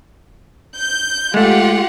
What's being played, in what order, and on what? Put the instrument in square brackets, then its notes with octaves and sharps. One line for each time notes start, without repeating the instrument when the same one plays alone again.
[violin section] G6
[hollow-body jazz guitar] G#3 A3 [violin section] F4 G4 F#5